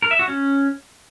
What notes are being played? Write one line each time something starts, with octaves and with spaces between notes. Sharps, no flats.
A#4
E5
F#4
C#4